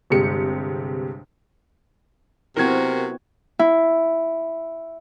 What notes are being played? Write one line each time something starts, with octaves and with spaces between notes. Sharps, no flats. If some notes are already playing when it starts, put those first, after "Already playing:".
G1 C3 G#3 G4 C#7
C3 B3 C4 E4 F#4 A#4 G#6
E4